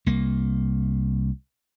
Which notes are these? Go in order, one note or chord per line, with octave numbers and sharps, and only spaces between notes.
C2 A#3